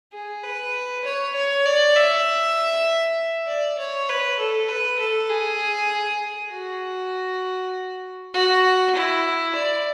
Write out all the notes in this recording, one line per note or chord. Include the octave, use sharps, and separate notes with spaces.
G#4
B4
C#5
C#5
D5
E5
D5
C#5
B4
A4
B4
A4
G#4
F#4
F#4
E4
D5